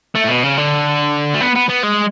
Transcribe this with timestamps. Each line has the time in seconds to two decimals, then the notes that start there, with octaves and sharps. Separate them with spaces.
0.15 A3
0.24 A2
0.28 B2
0.43 C#3
0.57 D3
1.34 A3
1.41 B3
1.56 B3
1.69 B3
1.83 G#3